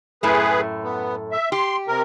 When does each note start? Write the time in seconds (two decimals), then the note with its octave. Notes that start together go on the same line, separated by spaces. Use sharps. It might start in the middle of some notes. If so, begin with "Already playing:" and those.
0.23 F#2 A2 A3 G#4 B4
0.84 B3
1.32 E5
1.52 G4 C6
1.88 C3 A#4